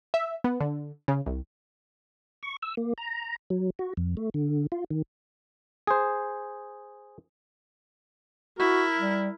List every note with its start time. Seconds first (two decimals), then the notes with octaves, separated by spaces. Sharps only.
0.14 E5
0.44 B3
0.60 D3
1.08 C#3
1.26 C2
2.43 C#6
2.62 E6
2.77 A#3
2.98 A#5
3.50 F#3
3.79 F#4
3.97 F2
4.17 A3
4.34 D3
4.72 F4
4.90 D#3
5.87 G#4 C5
8.58 E4 F#4 A#4
8.99 G3